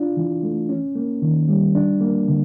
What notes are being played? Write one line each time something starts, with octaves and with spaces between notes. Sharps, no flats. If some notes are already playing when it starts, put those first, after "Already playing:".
Already playing: D4 F4
E3
A3
C#4
A#3
D#3
G3
D4
A#3
D3